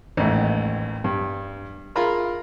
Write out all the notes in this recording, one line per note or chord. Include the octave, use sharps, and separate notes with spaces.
A1 D#2 G#2 A3
G2
F4 G#4 A#4 A#5 B5